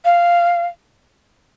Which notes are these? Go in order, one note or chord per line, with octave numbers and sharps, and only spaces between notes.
F5